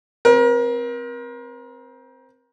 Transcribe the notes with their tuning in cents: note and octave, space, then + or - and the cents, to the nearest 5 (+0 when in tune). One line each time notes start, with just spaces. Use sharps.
C4 +0 A#4 +35